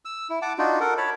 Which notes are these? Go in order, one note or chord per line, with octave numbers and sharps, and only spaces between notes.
E6
E4
F#5 A5 D6
D4 D#4 F4 F#4
A4 A#4 F#5
C#5 A5 B5